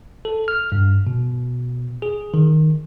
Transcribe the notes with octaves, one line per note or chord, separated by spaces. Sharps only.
A4
F6
G2
B2
G#4
D#3